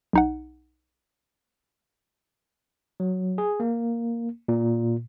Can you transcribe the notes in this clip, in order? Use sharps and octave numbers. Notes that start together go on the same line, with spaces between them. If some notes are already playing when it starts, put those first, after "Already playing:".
B1 D#4 F#5
F#3
G#4
A#3
A#2